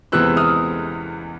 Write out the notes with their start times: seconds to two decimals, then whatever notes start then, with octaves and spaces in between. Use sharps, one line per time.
0.12 E2 C3 E3 G#3 B3 E6 F#6
0.37 D#6 F6